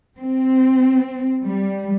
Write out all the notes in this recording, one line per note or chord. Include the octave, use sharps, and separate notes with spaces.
C4
G3